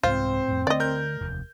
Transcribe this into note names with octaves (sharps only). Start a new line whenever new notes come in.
C2 G#2 C4 F4 C5
F2 A2
D3 A3 D5 D#5
A#4 G6
F1 D#2